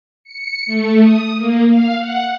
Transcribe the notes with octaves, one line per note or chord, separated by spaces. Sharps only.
C#7
A3
D#6
A#3
F5
F#5